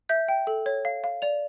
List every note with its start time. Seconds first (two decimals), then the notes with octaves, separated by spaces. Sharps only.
0.09 E5 G6
0.28 G5
0.47 A4
0.66 C#5
0.85 F5
1.04 F5
1.22 D5 F7